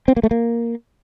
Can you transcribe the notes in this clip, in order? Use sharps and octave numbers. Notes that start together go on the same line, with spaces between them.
C4
A#3
A3
A#3